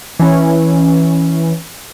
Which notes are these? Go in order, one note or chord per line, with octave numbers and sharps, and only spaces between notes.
E3 C#4